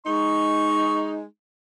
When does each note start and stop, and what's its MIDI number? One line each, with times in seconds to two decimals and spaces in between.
0.06 1.23 56
0.06 1.23 63
0.06 1.10 85